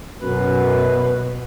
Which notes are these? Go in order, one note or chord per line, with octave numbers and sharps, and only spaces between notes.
F#2 B2 B4